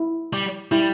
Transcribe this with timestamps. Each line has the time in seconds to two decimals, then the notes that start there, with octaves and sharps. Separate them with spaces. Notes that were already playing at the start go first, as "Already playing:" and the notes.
Already playing: E4
0.33 G3
0.72 G3 E4